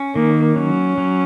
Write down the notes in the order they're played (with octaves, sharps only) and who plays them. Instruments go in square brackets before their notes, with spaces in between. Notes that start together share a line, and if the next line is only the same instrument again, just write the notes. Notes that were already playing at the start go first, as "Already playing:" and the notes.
Already playing: [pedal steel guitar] C#4
[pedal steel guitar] D#3 [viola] A#3
[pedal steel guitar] F#3 [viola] C#4
[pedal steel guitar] F#3